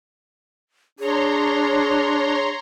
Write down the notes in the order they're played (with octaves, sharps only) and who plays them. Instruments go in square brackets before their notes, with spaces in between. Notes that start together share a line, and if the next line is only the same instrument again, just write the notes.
[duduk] D4 [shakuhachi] G#4 [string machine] C#5 A#5 C6